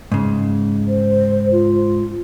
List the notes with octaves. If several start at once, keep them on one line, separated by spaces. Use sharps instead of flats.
G#2 C#3
C5
F4